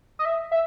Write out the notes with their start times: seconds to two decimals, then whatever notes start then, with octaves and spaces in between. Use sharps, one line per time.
0.19 D#5
0.25 E5
0.52 E5